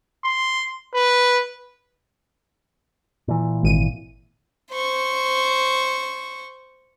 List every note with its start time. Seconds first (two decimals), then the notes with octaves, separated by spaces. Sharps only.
0.24 C6
0.94 B4
3.28 A#2 E3
3.63 G#1 D#7
4.71 C5 C#6